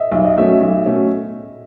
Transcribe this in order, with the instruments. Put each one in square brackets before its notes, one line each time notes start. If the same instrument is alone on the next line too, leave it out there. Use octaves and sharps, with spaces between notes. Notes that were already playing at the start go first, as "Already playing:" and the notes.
Already playing: [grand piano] D#5 E5
[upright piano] B1 [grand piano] E5
[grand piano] D#5
[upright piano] B2 F#3 A3 C#4 [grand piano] E5
[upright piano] B1
B2 F#3 A3 C#4